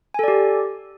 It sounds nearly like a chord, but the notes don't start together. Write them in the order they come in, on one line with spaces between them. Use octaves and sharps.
G#5 A4 D5 G4